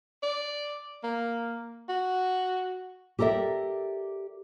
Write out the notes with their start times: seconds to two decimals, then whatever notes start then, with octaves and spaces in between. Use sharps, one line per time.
0.23 D5
1.04 A#3
1.89 F#4
3.19 G4 A4 A#4 D5 E5